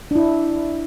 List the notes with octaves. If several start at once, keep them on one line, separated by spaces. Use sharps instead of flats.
D4 E4